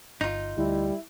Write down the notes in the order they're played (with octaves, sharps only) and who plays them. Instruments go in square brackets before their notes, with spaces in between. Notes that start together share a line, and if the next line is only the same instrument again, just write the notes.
[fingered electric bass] G1 [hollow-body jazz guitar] D#4 F4
[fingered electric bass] D2 [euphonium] G3 [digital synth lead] E4